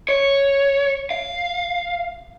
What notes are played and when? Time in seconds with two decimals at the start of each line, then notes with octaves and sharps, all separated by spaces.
0.09 C#5
1.11 F5